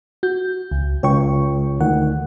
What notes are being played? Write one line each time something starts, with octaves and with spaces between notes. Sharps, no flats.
F#4 G6
C#2
C#2 C#5 G5 C#6
D2 D#3 F#5